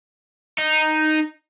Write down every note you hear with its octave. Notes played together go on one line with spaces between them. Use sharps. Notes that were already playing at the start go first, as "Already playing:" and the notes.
D#4